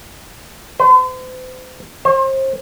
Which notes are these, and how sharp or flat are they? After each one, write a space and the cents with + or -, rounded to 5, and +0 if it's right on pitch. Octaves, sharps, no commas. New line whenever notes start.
C5 -45
C5 +35